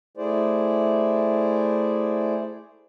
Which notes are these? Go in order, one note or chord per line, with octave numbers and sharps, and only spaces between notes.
A3 E4 G#4 C5 D5